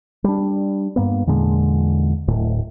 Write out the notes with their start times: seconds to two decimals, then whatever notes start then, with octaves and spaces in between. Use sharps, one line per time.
0.24 G3 D4
0.96 G2 A#3 B3
1.27 E2 A#2 D3 G#3
2.28 D1 A2